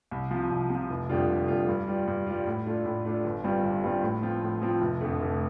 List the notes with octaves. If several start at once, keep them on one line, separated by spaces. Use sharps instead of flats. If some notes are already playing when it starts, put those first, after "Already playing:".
C2
C3 F3
C2
C3
F3
F1
F2 D3 G3 F4
F1
F2 D3 G3 F4
G2
G3 F4
G2
G3 F4
A2
A3 D4 F4
A2
A3 D4 F4
G1
G2 G3 C4 F4
G1
G2 G3 C4 F4
A2
F3 C4 F4
A2
F3 C4 F4
F1
F2 D3 A3
F1